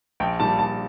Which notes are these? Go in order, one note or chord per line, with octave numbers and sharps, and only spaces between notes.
A#1 G5
A#2 G3 A5
A#1 A5